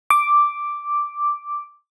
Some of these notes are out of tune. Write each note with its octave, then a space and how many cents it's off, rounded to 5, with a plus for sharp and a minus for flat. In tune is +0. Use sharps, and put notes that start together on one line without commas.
D6 +0